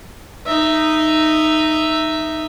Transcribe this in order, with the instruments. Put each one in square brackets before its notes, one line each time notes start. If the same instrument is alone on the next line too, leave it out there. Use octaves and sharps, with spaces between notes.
[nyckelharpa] D#4 E5